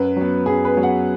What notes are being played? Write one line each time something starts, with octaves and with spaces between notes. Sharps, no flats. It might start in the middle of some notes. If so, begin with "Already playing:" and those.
Already playing: F#2 B4
F#3 B3
F#2 G#4
B4
F#3 B3
F#5